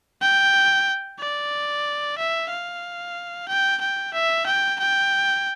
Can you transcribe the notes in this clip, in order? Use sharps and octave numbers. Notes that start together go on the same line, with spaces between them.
G5
D5
E5
F5
G5
G5
E5
G5
G5